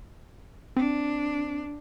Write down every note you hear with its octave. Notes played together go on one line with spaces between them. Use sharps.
C4 D4